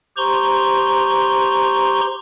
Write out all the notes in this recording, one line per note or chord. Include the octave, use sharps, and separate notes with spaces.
G4 C5 A#5 C6 C#6